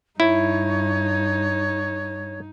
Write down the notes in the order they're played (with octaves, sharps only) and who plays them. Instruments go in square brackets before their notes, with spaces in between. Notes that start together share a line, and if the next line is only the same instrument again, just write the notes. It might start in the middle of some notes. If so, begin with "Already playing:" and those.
[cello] G2 [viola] D#4 [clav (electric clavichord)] E4 [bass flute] C#5